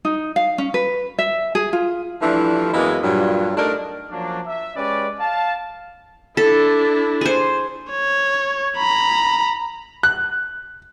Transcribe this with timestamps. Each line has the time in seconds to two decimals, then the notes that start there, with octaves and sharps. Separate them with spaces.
0.05 D#4
0.36 F5
0.58 C#4
0.74 B4
1.19 E5
1.55 G#4
1.73 F4
2.21 E3 F3 G3 A3 D4 E4
2.73 F#2 E3 G#3 A#3 B3 D#5
3.03 G2 A#2 F#3
3.57 A3 D4 D#4 A#4 D5
4.11 F3 F#3 A#3 C#4 D4
4.47 E5
4.76 G#3 C#4 G4 B4 D5
5.20 F5 A5
6.37 D4 E4 A4
7.21 G#4 C5
7.91 C#5
8.77 A#5 B5
10.03 F#6